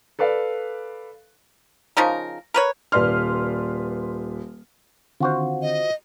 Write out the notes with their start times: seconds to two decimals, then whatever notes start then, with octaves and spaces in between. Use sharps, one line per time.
0.19 A4 B4 D5 F5
1.97 C#3 F3 D#4 A#4
2.54 A#4 B4 C#5
2.92 D#1 B4 D5 C6 F6
5.20 D3 D#3 C4 F4 F#4 C5
5.62 D#5